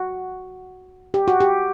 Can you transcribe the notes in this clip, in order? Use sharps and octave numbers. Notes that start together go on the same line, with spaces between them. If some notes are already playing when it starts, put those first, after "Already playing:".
Already playing: F#4
G4
F#4
G4